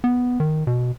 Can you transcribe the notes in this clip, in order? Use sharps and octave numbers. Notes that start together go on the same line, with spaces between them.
B3
D#3
B2